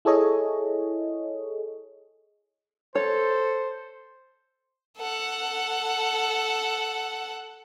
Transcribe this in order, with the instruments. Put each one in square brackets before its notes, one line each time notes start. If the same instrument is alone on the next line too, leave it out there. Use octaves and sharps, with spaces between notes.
[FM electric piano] E4 G#4 A4 C#5 D#5
[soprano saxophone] A4 [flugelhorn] C5 [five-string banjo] C#5
[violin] A4 F#5